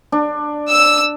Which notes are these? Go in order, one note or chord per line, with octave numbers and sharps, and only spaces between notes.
D4
E6